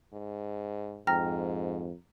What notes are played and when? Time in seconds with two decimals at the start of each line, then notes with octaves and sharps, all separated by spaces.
0.13 G#2
1.07 F2 G#2 G5 A#5 F6 A#6